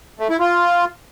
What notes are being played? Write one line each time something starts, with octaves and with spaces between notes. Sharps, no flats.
A3
E4
F4